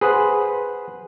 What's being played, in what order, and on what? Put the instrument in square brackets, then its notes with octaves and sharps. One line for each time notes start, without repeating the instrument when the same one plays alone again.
[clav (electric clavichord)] G#4 B4 C5 F#5